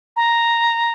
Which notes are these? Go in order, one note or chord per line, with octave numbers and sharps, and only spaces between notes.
A#5